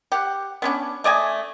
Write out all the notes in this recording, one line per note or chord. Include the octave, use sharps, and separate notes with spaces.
G4 F#5
B3 C#4 D4
A3 D5 D#5 G#5